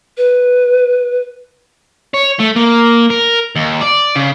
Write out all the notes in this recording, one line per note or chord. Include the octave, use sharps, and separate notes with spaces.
B4
C#5
A3
A#3
A#4
D#2
D5
C#3